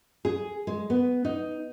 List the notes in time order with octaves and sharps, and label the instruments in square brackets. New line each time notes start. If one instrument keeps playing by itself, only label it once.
[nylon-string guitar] G#4
G#3
B3
D#4